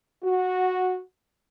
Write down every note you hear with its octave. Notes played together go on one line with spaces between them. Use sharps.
F#4